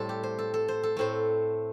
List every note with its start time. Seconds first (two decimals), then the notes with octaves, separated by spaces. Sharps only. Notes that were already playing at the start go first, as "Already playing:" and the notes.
Already playing: A2 G3 C4 A4
0.09 G4
0.23 C5
0.39 A4
0.54 A4
0.68 C5
0.83 A4
0.97 A2 A3 C4 C5